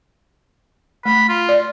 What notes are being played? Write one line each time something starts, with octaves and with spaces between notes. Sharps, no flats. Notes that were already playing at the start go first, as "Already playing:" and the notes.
A3 B5
F4
D5